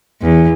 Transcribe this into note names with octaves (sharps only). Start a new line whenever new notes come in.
E2